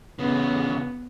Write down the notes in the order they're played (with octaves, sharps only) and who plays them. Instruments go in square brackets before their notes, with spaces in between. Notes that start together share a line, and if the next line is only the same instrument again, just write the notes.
[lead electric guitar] E2 C#3 [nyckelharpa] B3